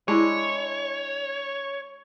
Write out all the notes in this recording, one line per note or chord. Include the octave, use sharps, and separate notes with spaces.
G#3 D4 E4 C#5